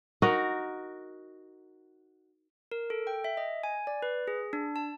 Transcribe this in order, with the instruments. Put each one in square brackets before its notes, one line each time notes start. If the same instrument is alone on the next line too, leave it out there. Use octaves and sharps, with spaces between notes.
[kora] D#4 F#4 A#4
[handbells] A#4
A4
G5
E5
D#5
G#5
D5
B4
G#4
D4
A5